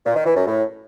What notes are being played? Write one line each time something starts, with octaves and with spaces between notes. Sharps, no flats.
A#2
D#3
E3
F#2
A2